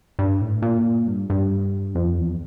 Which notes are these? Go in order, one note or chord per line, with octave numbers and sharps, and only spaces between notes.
G2
A2
A#2
G2
G2
F2
E2